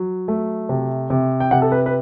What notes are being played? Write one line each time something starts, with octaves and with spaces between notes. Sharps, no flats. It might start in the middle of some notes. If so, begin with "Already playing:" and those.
Already playing: F#3
A3
C3
C3
G5
C3 F#5
A4
B4
B4